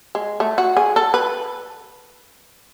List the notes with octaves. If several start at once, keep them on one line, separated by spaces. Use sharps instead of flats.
G#3
A3
F#4
G#4
A4
B4